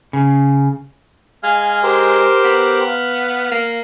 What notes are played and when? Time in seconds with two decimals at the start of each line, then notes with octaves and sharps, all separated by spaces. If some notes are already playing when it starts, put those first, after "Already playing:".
0.13 C#3
1.43 G#3 F5 G#5 F6
1.83 G4 A#4 C5
2.44 B3
2.87 F5
3.51 A#3